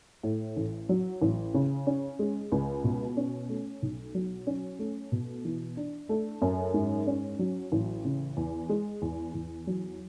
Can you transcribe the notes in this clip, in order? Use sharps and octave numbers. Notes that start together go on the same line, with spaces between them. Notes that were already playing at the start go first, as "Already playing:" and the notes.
A2
A1
F#3
A1
C#3
C#4
G#3
C#2
B2
C#4
A3
B1
F#3
C#4
A3
B2
E3
D4
A3
F#2
G#2
C#4
F#3
A1
C#3
E2
G#3
E2
E2
F#3